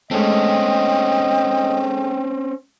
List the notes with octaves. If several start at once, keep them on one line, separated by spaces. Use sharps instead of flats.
G#3 A3 C4 C#4 D#5 G5